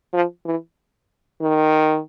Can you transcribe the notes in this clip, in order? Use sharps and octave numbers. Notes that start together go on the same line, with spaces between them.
F3
E3
D#3